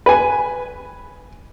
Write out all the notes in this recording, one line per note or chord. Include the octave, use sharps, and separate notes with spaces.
B4 G#5